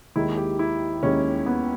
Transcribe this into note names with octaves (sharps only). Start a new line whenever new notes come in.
D#2 D#3 G#3 E4
G4
E4
D#2 D#3 G#3 C#4
B3